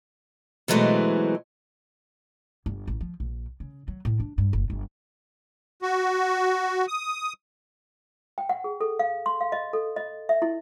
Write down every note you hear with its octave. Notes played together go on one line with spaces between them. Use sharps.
B2 E3 F#3 G#3 A3 C4
G1
A1
F3
A#1
C#3
F#3
A2
D4
G2
F#1
G1
F#4
D#6
G5
F#5
G#4
A4
F5
C6
F5
D#5
A4
D#5
E5
E4